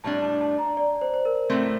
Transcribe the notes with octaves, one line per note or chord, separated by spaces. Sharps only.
A2 G3 D4 A5
A5
A5
A#5
D5
C5
C5
A#4
A2 F#3 A3 C4